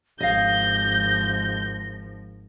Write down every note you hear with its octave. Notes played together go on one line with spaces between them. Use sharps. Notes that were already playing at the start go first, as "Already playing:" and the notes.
G#1 F3 D#5 F5 G6 A#6